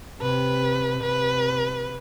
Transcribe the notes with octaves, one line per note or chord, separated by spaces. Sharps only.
C3 B4
C3 B4